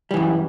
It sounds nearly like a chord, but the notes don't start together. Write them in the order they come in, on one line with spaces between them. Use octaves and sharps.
G3 E3 F#2